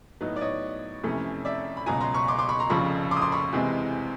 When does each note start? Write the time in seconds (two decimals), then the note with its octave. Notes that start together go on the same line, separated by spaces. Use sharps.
0.21 A2 F#3 B3 D#4
0.36 D5
0.41 C#5 D#5
1.04 F2 C3 E3 A3 C#4
1.45 D5 E5
1.77 B5
1.86 C#2 B2 F#3 G#5 A#5
2.00 A#5 C6
2.14 B5 C#6
2.28 C6 D6
2.38 C6 D6
2.49 B5 C#6
2.59 A#5 C6
2.70 F1 F2 C#3 F3 B5 C#6
3.11 C6 D6
3.17 D#6
3.21 C6 D6
3.32 B5 C#6
3.53 E2 C3 E3 G#3 C4